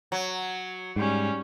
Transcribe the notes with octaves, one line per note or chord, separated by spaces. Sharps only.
F#3
G#2 G3 C#4